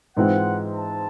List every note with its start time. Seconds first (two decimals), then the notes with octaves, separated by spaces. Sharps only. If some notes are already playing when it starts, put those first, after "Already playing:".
0.17 G#2 E3 G#3 C4 F4 F#5
0.75 A5